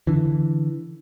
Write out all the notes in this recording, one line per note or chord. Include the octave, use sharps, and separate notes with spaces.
D3 E3